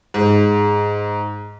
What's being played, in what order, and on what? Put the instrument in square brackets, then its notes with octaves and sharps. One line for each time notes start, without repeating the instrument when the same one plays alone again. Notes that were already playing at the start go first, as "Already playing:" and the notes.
[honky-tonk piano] G#2